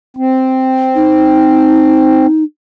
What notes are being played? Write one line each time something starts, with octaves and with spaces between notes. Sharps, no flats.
C4
D#4